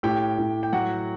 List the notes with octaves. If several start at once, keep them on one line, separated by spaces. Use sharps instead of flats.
A2 G4 G5
A2
G5
F#3 F#4 F#5